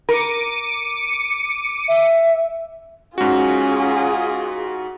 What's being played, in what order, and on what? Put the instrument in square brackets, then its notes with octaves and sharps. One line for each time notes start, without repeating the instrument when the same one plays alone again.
[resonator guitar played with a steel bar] A#4 [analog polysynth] D6 C#7 D#7
[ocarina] E5
[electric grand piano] G#2 F#4 [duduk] C#4 [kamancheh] F4 G#4